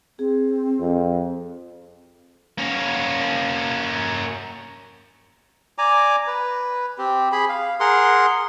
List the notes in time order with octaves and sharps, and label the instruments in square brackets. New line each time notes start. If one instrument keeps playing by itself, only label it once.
[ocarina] C4 [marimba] G#4
[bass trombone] F2
[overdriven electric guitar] A#3 C#4
[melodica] D5 G#5 A#5 D6
B4
C4 G4
G#4 B5
F5
G#4 A#4 F#5 C6